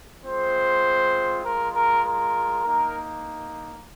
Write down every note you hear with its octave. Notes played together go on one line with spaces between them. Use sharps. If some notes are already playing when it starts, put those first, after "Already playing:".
G#3 C4 F4 C5
G#3 F4 A#4
A#4
A#4
A#3 D#4 A#4